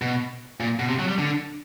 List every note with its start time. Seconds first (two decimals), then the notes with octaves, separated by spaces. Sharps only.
0.02 B2
0.60 A#2
0.79 B2
0.88 C3
0.99 F#3
1.08 G3
1.18 D3